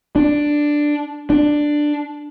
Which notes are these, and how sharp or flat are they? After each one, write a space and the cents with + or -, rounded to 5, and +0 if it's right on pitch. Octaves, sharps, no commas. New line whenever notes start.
D4 +5
D4 +10